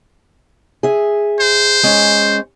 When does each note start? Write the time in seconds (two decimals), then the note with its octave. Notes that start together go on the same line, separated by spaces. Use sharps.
0.83 G#4 E5
1.41 C5
1.83 G#3 C#4